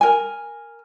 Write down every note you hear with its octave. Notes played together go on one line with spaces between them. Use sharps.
A#4 G#5